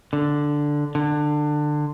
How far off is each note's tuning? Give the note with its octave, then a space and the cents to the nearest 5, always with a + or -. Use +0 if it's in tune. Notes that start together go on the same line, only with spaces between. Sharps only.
D3 +0
D3 +20